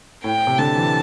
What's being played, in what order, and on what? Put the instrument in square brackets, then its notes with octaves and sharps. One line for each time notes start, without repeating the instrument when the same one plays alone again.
[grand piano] A2 [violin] G5
[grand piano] C3
[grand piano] D3 [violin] A5
[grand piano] E3